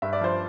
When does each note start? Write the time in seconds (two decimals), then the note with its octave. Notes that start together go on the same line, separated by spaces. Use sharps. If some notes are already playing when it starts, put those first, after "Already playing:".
0.02 G2 E5
0.13 D5
0.21 F3 C5